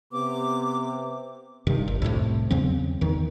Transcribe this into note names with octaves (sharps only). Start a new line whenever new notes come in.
C3 B3 D6
G2 C3 D#3
G1
C2 F2 A2 C3
E2 C#3 F#3 C4
E2 D#3